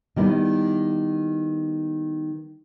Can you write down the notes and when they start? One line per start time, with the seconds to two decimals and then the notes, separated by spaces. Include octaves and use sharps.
0.16 D#3 G3 B3 E4